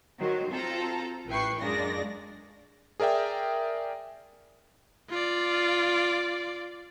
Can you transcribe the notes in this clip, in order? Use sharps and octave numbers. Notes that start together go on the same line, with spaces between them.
D#3 F#3 C5
C4 F4 A4 A5 A#5
A1 E4 B4 G5 C#6 C7
F#2 A#2 G#3 D4 D5 A#6
G#4 A#4 D5 E5 G5
F4 D5